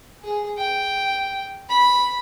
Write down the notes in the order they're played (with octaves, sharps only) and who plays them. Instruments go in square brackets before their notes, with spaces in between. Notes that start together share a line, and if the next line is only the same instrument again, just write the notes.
[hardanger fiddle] G#4
G5
B5